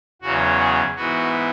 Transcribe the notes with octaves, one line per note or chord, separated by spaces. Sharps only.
E2 C#3 F#3 F#4
G#4
G#2 E3 B3 F#4